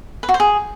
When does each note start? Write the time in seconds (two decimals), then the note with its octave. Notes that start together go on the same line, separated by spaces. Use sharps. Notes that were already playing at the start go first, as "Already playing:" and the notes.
0.23 B4
0.29 F#4
0.34 C5
0.40 G#4